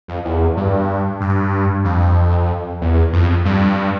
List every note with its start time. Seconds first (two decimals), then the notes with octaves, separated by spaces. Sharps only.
0.08 F2
0.25 E2
0.57 G2
1.21 G2
1.84 F2
2.81 E2
3.13 F2
3.45 G2